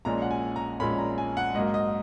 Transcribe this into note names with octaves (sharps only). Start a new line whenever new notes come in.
A#1 A#2 G#3 C#4 A#5
F#5
G#5
A#5
A#1 A#2 G#3 C#4 B5
A#5
G#5
F#5
G#2 F#3 A#3 D#5
D#5